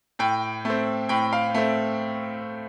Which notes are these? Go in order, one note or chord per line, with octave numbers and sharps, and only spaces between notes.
A2 G5
A3 C4
A2 G5
F5
A3 C4